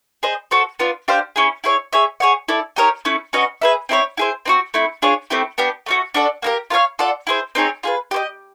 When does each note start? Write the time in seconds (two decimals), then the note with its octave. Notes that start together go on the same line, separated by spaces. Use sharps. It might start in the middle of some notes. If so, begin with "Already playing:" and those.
0.23 G#4 C5 D#5
0.51 F#4 A4 C5
0.79 B3 D4 F4
1.08 D4 G4 C5 F5
1.36 C#4 E4 G#4
1.64 E4 G#4 C#5
1.93 G#4 C#5 E5
2.20 G#4 C#5 F#5
2.48 E4 A4 D5
2.76 D#4 G4 A#4 C#5
3.05 A3 C#4 E4
3.33 C#4 F#4 B4 D#5
3.62 G#4 B4 E5
3.89 C4 E4 A4 C#5
4.17 E4 G#4 C5
4.46 C4 D#4 F#4
4.74 A3 C4 E4
5.02 D4 F4 G#4 C#5
5.30 A3 C4 E4 G4
5.58 B3 D4 G4
5.86 A3 C#4 F#4
6.14 D4 F#4 A4 D5
6.42 A#3 D#4 G4 A#4
6.70 F4 A#4 C#5 F5
6.99 F4 A4 D5 F#5
7.27 E4 G#4 C5
7.55 C4 D#4 G#4 C#5
7.83 F4 G#4 B4
8.11 G4 C5 D#5